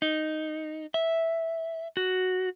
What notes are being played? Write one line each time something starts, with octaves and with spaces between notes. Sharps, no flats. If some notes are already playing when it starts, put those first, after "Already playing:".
D#4
E5
F#4